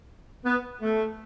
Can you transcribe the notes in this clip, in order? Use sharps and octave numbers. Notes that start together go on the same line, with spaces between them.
B3
A3